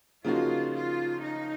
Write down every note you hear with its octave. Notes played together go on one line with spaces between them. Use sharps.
C#3 F3 A#3 D#4 F4 F#4
F4
D#4